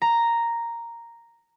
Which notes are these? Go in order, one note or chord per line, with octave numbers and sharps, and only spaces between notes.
A#5